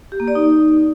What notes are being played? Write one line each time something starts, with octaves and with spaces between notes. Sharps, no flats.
G4
A#3
D5
D#4